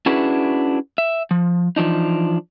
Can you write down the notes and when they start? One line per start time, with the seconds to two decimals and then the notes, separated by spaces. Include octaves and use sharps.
0.06 C#4 D4 E4 F#4 G#4 B4
0.98 E5
1.31 F3
1.76 E3 F3 D4 D#4